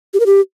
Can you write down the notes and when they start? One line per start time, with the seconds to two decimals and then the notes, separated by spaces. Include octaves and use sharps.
0.14 G4
0.20 A#4
0.26 G4